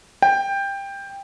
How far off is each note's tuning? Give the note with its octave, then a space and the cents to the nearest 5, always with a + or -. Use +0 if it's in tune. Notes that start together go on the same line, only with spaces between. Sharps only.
G5 +15